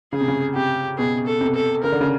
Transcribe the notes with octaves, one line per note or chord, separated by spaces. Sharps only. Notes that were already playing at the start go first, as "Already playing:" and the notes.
C#3 G#4
C3
C#3
C3 G4
B2 G#4
A4
C3
A4
C#3 A#4
D3
C#3